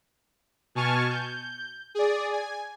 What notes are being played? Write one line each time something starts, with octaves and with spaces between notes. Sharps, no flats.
B2 G#5 A5 C#6 F6 G#6
G6
G#4 D5
G#5